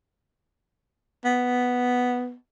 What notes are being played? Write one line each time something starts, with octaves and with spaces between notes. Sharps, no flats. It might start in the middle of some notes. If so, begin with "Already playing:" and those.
B3